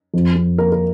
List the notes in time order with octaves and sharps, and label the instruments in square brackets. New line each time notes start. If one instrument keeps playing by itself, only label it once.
[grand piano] F2
F2
A#3 A#4
A#4